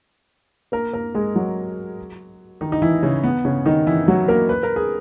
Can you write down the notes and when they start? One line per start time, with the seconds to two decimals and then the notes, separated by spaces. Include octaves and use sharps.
0.72 A#3 A#4
0.93 A#3 A#4
1.15 G#3 G#4
1.35 F#3 F#4
2.61 D#3 D#4
2.72 D#4
2.82 E3 E4
3.03 C#3 C#4
3.23 B3
3.45 C#3 C#4
3.66 D#3 D#4
3.87 E3 E4
4.08 F#3 F#4
4.28 A#3 A#4
4.49 B4
4.63 A#4
4.76 G#4